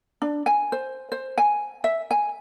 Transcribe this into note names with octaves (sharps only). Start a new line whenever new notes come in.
D4
G#5
C5
C5
G#5
E5
G#5